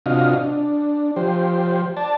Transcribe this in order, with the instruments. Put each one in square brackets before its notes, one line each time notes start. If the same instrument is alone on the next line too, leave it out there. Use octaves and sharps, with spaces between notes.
[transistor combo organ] C3 D4 F4 F#4 D#5 F5
D4
F3 G4 C5
D5 A5